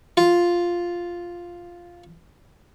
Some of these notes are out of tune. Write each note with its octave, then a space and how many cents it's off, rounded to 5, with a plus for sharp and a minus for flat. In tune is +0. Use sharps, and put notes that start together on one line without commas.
F4 +0